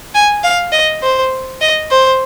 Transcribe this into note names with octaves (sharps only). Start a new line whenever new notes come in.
G#5
F5
D#5
C5
D#5
C5